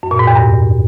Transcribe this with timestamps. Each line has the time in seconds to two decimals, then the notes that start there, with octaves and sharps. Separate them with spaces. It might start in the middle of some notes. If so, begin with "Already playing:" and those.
0.03 F#2
0.11 A#2
0.19 G#2
0.27 E2
0.35 G2